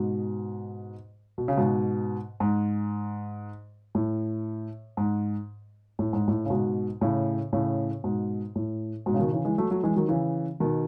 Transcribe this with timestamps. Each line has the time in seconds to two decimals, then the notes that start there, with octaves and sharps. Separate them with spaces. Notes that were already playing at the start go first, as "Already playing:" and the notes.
Already playing: G#2 B2
1.38 B2
1.48 C#3
1.57 G#2 B2
2.40 G#2
3.95 A2
4.97 G#2
5.99 A2
6.13 G#2
6.28 A2
6.45 C#3
6.50 G#2 B2
7.01 A2 C#3
7.53 A2 C#3
8.04 G#2 B2
8.56 A2
9.06 G#2 B2
9.14 C#3
9.19 B2 D#3
9.32 C#3 E3
9.45 E3 G#3
9.58 F#3 A3
9.70 F#3 A3
9.83 E3 G#3
9.96 D#3 F#3
10.09 C#3 E3
10.60 B2 D#3